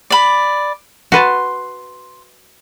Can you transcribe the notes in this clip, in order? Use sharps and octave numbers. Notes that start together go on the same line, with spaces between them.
D5 B5
F#4 B4 A5 C6